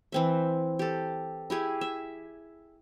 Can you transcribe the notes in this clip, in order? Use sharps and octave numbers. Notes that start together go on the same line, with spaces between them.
E3 C4 E5
G4 A4
E4 G4 G#4
E5